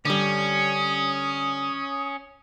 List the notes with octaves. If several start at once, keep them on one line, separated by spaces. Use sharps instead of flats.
D3 G3 C#4 D#6